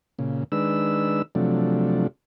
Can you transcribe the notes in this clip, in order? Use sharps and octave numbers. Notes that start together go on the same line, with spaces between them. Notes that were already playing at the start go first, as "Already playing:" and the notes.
A#2 C#3
D#3 G#3 D4 B4 E6
C3 F3 F#3 A3 D4